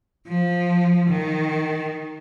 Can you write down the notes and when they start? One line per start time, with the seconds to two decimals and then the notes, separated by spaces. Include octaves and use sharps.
0.28 F3
1.10 D#3